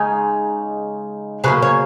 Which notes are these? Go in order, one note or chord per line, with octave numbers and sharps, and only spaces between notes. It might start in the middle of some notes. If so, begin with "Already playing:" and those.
Already playing: C#3 G#3 D#4 G#5
C#3 F#3 A#3 G#4 B4
C#5